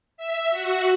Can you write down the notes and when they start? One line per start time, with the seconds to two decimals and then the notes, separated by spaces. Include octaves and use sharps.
0.17 E5
0.50 F#4